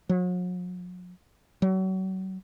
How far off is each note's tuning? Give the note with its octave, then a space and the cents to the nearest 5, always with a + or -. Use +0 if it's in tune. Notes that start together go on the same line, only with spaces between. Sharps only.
F#3 -45
F#3 +35